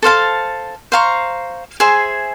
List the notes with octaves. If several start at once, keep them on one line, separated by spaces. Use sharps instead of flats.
A4 C5 F5 A5
C5 F5 A#5 C#6
G#4 C5 E5 G#5